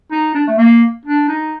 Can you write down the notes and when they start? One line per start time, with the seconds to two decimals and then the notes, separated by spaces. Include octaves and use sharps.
0.12 D#4
0.35 D4
0.47 A3
0.58 A#3
1.06 D4
1.29 D#4